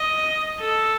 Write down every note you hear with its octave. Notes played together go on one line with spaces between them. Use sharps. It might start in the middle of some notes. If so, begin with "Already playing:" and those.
Already playing: D#5
A4